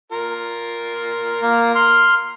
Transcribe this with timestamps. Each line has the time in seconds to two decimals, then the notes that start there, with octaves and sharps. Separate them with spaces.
0.12 F4 A#4
1.42 A#3
1.75 C6 F6